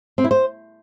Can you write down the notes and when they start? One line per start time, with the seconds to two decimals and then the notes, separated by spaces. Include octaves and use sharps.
0.18 C4
0.24 E4
0.31 C5